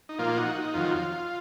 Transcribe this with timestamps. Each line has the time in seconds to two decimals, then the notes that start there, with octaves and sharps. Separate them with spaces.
0.09 D#4
0.19 A#2 F3 A#3 F4
0.37 D#4 F#4
0.55 D#4
0.74 F2 D#3 F#3 F4